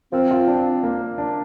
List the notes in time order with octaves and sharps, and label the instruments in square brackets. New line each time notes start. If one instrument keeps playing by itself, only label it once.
[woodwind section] F3 C4 [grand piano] A#4
[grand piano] F4
D4
A#3
D4